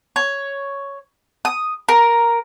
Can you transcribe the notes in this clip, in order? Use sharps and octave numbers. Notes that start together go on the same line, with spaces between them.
C#5
D#6
A#4